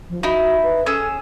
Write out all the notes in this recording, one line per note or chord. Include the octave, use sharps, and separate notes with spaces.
F3
D#4 E4 F#4
B4
C#4 G#4 A4 E6